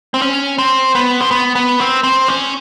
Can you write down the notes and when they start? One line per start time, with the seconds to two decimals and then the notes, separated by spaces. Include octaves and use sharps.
0.14 C4
0.22 C#4
0.58 C4
0.95 B3
1.20 C4
1.31 B3
1.55 B3
1.80 C4
2.04 C4
2.28 C#4